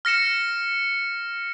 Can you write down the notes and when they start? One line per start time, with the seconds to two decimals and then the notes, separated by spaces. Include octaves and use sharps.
0.05 F6 A#6 C#7 E7